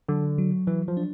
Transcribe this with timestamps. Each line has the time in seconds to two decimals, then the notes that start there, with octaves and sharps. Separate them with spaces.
0.08 D3 F#3
0.38 F#3
0.67 E3 F#3
0.88 F3
0.97 D4